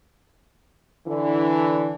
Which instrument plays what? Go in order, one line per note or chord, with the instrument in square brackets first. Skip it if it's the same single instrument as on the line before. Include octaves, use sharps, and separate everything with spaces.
[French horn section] D3 E3